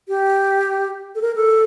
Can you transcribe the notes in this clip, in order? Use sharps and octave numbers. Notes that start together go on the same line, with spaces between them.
G4
A4
A#4
A4